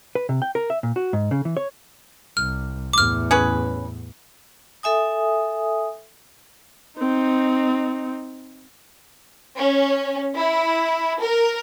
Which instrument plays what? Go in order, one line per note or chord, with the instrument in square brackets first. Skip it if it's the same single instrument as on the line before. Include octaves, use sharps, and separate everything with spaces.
[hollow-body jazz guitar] B4
C3
G5
A#4
E5
A#2
F#4
G#2
C#3
E3
C#5
[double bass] C2 [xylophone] F6
[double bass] E2 A2 [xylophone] D6 F6
[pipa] C#4 G#4 B4
[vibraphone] A4 E5 G#5 D#6
[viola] C4 D#4
[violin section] C#4
E4
A#4